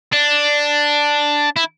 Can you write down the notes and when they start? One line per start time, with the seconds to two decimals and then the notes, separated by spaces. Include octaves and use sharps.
0.13 D4
1.56 E4